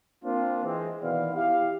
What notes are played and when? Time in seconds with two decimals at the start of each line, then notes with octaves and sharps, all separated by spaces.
0.25 A#3 C4 D4 F4
0.64 E3 G#3 C4
1.03 B2 D#3 E3 B3 D5 F5
1.35 E4 G4 F5